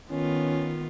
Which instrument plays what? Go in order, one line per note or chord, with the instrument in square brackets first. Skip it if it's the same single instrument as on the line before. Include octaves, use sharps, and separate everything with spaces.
[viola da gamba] D#3 B3 F4 [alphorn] C#4